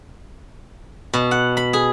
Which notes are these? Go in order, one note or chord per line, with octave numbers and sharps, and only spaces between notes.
B2
F#5
B5
G#4